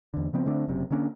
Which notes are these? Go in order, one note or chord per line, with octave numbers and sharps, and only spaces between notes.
E2 D3
C#3 F3 B3 C4
D3 A3 C4 D4
F#1 F#2 C3
D3 A#3 C#4 D4